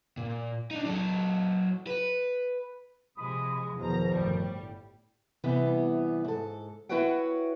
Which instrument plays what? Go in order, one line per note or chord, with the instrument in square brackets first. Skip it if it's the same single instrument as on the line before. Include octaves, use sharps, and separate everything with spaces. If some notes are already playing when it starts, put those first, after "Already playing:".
[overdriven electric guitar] A#2
D4 D#4
F#3 A4
B4
[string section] C3 F3 G#3 [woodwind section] B5 D#6
[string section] E2 A#5 [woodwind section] B2 D#3 F3
[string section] G1 A2 G3
[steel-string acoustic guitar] C3 E3 G3 B3
G#2 A4
E4 F#4 B4 C#5 F#5 G5